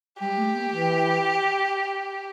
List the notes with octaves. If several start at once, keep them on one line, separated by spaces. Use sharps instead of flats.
G3 G4
A3
A#3
E3